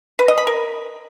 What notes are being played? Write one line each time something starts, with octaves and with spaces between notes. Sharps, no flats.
B4
D#5
B5
A#4